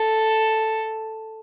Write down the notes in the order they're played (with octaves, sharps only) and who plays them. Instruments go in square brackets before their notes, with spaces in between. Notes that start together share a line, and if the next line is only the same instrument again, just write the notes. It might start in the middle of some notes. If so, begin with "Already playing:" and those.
Already playing: [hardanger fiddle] A4